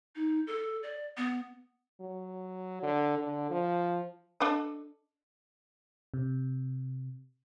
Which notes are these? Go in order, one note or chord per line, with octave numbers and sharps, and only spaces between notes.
D#4
A4
D5
B3
F#3
D3
D3
F3
D4 A4 D#5
C3